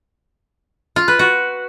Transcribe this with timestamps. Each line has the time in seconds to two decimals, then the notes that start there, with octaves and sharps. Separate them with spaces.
0.96 F4
1.08 B4
1.19 F#4